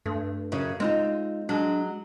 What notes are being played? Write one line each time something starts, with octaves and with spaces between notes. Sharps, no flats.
G2 A3
F#2 C#3
G#3 C4 D#4 F4
F#3 G#3 D4